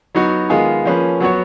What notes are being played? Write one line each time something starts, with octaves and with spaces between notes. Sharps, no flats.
F#3 B3 D#4 F#4
D#3 G#3 B3 F4 G#4
F3 A#3 C#4 G#4 B4
F#3 B3 F#4 C#5